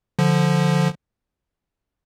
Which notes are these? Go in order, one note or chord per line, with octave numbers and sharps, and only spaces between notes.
D3 F3